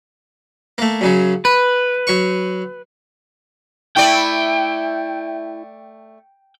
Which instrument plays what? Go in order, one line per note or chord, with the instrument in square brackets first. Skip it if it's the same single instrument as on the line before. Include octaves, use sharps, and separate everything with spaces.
[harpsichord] A3 A#3
F#2 C#3 F#3
[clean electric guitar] B4 [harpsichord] B5
[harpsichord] F#3 C#6
[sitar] A3 D5 [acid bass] E4 [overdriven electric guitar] G5